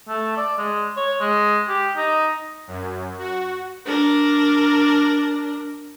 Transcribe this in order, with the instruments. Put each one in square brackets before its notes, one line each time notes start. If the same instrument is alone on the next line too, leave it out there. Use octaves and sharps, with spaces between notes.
[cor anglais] A3
D5
G#3
C#5
G#3
G4
D#4
[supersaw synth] F#2
F#4
[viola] D4 A#4